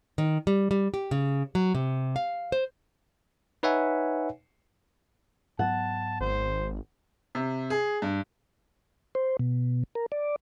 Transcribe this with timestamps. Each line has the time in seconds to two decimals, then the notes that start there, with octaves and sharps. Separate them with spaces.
0.18 D#3
0.47 G3
0.71 G3
0.94 G4
1.11 C#3
1.55 F#3
1.75 C3
2.16 F5
2.52 C5
3.63 D#4 B4 C#5 E5 F#5 G#5
5.59 G#2 F#3 B3 F#5 A5
6.21 G#1 C5
7.35 C3
7.70 G#4
8.02 G2
9.15 C5
9.39 B2
9.95 A#4
10.12 D5